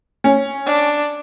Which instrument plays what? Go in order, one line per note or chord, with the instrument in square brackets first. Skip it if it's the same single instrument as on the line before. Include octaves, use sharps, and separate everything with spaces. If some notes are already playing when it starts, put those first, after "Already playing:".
[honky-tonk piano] C#4
[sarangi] D4